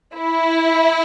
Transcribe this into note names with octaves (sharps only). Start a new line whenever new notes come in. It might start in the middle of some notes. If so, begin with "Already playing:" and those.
E4